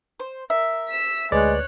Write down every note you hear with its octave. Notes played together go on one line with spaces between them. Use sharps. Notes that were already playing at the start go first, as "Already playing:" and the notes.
C5
A#4 E5
B6 E7
D2 G#3 B4 C#5 D5 F#6